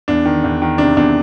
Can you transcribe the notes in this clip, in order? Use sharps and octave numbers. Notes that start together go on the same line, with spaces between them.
E2 D4
D#3
E2
D#3
C3 D4
E2 D4